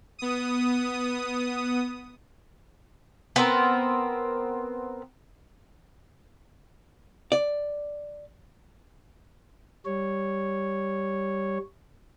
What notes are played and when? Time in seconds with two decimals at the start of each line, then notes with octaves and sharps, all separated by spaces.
0.19 B3 D#6
3.36 B3 C4 A#4
7.32 D5
9.85 G3 C#5